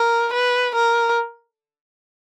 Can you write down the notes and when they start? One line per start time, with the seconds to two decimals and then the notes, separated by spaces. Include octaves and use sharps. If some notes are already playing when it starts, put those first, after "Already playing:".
Already playing: A#4
0.33 B4
0.74 A#4